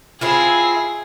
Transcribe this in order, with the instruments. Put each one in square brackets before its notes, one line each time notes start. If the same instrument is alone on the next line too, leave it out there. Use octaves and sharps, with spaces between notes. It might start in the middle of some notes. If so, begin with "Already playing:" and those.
[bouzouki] C4 E4 F4 [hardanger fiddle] G#4